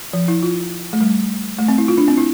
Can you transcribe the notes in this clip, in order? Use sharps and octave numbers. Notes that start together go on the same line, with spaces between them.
F3
E4
F4
A3
G3
A3
C4
E4
F4
D4
C4
E4